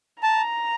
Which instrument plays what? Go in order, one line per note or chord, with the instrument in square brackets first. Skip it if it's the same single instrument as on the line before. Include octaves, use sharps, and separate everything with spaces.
[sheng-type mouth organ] A5 [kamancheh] A#5